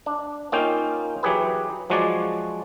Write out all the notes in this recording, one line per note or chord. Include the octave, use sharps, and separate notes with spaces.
D4
A#3 C#4 D#4 F4 G5
E3 F#3 G4 G#4 B4
F3 F#3 G#3 F#4 C#5 D5